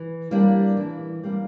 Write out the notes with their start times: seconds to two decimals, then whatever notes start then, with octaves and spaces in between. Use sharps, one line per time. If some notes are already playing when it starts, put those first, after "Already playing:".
Already playing: E3
0.31 G3 A#3 D4
0.77 E3
1.23 G3 A#3 D4